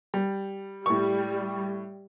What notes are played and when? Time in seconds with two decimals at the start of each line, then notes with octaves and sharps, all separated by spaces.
0.14 G3
0.86 A2 G3 C#6